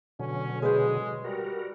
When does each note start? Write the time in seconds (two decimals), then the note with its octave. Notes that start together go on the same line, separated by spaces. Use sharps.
0.20 B2 D3 F#3 C#4
0.62 G#3 G#4 B4 C5
1.24 G3 F#4 A#4